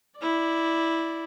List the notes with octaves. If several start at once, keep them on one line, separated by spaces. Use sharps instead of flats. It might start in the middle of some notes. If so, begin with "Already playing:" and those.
E4 D5